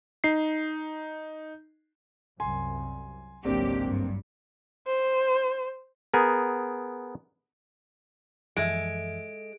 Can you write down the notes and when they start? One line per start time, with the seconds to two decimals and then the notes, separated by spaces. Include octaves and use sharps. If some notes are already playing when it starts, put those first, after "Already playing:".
0.24 D#4 C7
2.40 C2 F#2 C3 G#5 C6
3.45 G#1 C#2 F#3 A#3 C4 D4 G4
3.85 G2
4.87 C5
6.14 B3 G#4 A#4
8.57 F#2 E3 F3 G#3 A4 E5 D7